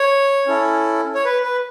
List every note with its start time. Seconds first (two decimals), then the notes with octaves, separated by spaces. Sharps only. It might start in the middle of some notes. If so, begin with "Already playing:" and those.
Already playing: C#5
0.47 C#4 E4 A4
1.15 C#5
1.25 B4
1.43 B4